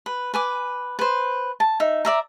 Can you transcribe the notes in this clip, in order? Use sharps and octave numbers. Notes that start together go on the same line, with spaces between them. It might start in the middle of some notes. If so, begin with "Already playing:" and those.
B4
B4 G#5 D6
B4 C5
A5
D#4 E5
D5 E5 A#5